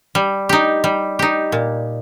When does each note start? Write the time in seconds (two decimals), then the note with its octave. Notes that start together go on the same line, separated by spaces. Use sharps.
0.15 G3
0.49 D#4 G4
0.84 G3
1.19 D#4 G4
1.52 A#2